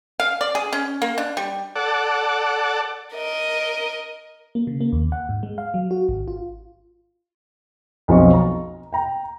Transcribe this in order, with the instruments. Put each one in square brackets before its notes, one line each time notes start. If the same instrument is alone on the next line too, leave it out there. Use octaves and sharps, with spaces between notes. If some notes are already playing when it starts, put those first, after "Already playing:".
[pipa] F5
D5
G#4
C#4
A#3
D4
G3
[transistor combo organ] A4 D5 F#5
[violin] A#4 D#5
[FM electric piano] A#3
C#3
A#3
D#2
F#5
G#2
G#3
F5
F#3
F#4
G#1
F4
[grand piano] B1 F2 F3 F4 C#6
A#5
G5 A#5